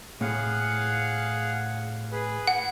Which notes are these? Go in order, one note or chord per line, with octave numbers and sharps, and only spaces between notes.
A2 G#4 F5 F#5
G#4 B4
F#5